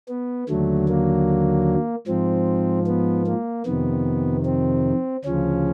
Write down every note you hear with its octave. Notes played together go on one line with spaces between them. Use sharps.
B3
D#2 D3 F#3 A3
A#3
G#2 F3 C4
B3
A#3
F2 C3 D#3 B3
C4
D2 C#3 F3 C#4